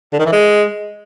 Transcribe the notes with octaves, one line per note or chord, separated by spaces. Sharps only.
D3
D#3
E3
G#3